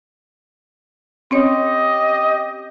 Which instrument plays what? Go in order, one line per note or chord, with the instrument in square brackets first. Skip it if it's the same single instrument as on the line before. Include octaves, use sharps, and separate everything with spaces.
[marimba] C4 C#4 C#5 [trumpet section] G4 D#5